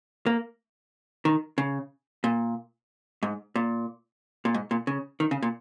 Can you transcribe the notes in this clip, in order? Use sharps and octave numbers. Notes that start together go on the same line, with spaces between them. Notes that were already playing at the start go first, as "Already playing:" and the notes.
A#3
D#3
C#3
A#2
G#2
A#2
A#2
G#2
A#2
C#3
D#3
C#3
A#2